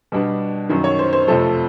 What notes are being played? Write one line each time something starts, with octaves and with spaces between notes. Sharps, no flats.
B2 G3 B3 D4
F#2 D#3 F#3
C#5
C5
C5
F2 C3 F3 A3 C4 A4